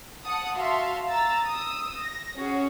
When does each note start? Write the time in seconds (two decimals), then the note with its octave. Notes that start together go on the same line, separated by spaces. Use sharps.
0.24 F#5 A5 D#6
0.55 F#4 E5 F5 A5 C6
1.08 A#5 E6 A6
1.45 D#6 E6
1.99 A#6
2.36 C#4 F#4 G#4